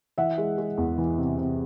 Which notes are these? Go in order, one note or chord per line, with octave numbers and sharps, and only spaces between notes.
E3 E5 F#5
G#3
G#3
E2
E3
C3
C3